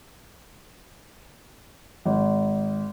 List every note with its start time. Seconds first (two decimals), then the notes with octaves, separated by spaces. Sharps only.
2.05 G#1